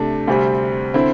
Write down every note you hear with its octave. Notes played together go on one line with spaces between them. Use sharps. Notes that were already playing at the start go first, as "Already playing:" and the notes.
Already playing: C3 A3 D4
D2 C3 G3 C4
D3 C4 E4